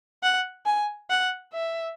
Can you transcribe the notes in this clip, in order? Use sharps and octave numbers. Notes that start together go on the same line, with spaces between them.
F#5
G#5
F#5
E5